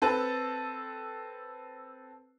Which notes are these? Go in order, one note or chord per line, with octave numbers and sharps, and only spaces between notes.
C4 A4 B4